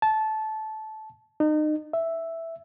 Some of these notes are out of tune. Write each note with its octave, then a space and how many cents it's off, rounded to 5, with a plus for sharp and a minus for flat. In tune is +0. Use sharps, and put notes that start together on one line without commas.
A5 -20
D#4 -30
E5 +0